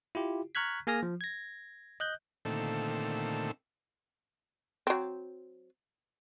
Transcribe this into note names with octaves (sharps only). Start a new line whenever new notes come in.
E4 F4 G4
A#5 C#6 F6 F#6 G#6 B6
A#3 G#4 G#5 F6 A#6
F3
G#6 A#6
D#5 F#6 G6
A#2 D3 D#3 A3 C4 A4
F#3 C4